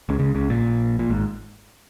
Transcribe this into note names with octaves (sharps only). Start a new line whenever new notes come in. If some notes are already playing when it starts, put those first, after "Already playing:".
C#2 C#3
C#2 C#3
C#2 C#3
A#1 A#2
A#2
G#1 G#2